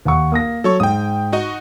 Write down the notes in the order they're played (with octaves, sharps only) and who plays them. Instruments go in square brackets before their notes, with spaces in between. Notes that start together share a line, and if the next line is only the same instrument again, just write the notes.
[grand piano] D#2 F#5 C#6
A#3 D#6 A#6
[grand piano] F#3 [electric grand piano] A4 C#5 C#6
[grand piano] G#2 [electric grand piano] G5 D#6
[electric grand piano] D#4 F#4 D#5